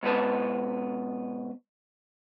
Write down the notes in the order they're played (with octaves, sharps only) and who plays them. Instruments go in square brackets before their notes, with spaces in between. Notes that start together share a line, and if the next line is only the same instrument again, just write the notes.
[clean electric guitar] G#2 B2 B4 A5